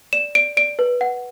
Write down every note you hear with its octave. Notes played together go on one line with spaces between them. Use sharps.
D5 E7
D5 D7
D5 D7
B4
F#5